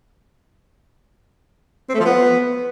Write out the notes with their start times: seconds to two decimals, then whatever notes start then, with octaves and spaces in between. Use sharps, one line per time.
1.89 C4
1.95 A3
2.00 F3
2.05 B3